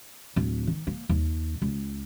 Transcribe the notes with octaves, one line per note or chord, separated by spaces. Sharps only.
D1
D#3
A#3
D#2
C#2